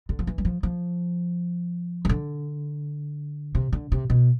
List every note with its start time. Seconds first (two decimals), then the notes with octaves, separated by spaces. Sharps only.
0.09 D3
0.19 F3
0.27 E3
0.38 G3
0.45 F3
0.63 F3
2.05 E3
2.09 D3
3.55 C3
3.73 D3
3.92 C3
4.10 B2